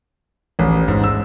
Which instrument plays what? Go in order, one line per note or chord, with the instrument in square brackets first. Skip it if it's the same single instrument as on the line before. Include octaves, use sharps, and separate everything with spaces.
[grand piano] A1
G#2
E6